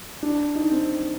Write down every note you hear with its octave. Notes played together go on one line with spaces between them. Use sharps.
D4
D#4
C4